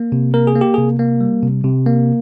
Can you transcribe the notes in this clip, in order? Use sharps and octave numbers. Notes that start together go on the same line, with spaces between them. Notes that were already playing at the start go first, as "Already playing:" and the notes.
Already playing: A#3
C3
A#3 A#4
G#4
A#3
G4
C3 G#4
A#3
G3
C3
C3
A#3